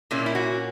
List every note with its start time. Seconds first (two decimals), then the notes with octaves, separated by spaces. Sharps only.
0.11 A#2 A#3 C#4 E4
0.26 E4
0.35 F#4